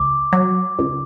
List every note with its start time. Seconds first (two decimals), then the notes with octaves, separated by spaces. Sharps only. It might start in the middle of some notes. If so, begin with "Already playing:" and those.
Already playing: C#2 D6
0.33 F#3
0.79 C#2